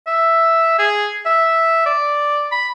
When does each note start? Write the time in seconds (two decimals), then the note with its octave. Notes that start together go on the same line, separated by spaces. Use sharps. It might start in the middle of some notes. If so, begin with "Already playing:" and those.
0.07 E5
0.79 G#4
1.26 E5
1.86 D5
2.52 B5